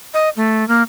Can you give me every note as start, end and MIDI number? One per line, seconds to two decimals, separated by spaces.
0.14 0.29 75
0.37 0.67 57
0.68 0.83 58